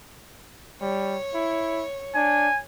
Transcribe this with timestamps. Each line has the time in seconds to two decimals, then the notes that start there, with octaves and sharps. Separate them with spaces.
0.81 G3 C#5
1.34 E4
2.16 D4 G#5